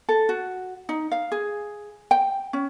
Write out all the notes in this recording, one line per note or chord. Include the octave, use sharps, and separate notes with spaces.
A4
F#4
D#4
F5
G#4
G5
C#4